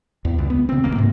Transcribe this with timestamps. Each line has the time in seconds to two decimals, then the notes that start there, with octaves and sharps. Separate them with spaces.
0.25 E2
0.38 C#2
0.50 B3
0.69 C#3 C4
0.84 D#1 C#2 A#3
0.96 G#2 C3